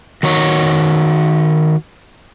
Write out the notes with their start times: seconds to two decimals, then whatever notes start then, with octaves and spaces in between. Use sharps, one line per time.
0.23 D#3 F#4 C#5